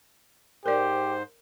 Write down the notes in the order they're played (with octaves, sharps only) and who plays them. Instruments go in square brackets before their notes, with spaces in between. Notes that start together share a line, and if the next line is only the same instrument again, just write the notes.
[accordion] G#2 C5 [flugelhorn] G4 [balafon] A#4 D5